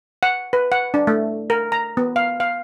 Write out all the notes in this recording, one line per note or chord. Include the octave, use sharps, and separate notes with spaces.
F#5
B4
F#5
D4
A3
A#4
A#5
B3
F5
F5